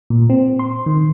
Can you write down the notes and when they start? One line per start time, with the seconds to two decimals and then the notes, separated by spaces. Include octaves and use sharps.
0.10 A#2
0.30 C4
0.59 C6
0.86 D#3